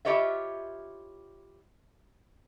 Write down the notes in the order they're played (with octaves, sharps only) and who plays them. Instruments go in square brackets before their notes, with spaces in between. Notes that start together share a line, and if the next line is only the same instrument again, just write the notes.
[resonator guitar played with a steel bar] E4 F4 G4 C#5 D#5 E5